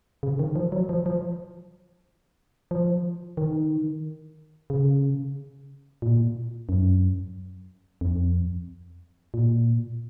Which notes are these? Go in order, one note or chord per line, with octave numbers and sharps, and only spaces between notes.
C#3
D#3
F3
F#3
F3
F3
F3
D#3
C#3
A#2
F#2
F2
A#2